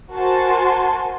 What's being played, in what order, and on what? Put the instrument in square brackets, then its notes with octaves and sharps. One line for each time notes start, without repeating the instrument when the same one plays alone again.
[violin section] F#4 A#4 C5 G#5 A5 C6